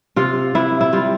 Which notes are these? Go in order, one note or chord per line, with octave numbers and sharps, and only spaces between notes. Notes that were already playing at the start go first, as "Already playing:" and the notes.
C3 F4
C3 E4
E4
G3 F4